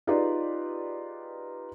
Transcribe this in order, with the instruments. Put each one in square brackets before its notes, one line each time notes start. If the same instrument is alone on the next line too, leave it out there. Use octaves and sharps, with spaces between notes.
[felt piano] D#4 F4 G4 G#4 B4 D5